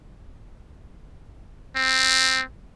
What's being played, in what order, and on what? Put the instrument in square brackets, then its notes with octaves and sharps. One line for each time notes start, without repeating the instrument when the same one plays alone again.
[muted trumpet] C4